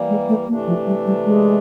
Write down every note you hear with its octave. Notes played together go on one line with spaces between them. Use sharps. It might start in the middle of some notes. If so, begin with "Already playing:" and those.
Already playing: E3 G3 A#3
G#3
A3
C3 E3 A3 A#3 D4
F3
G3
G3
G#3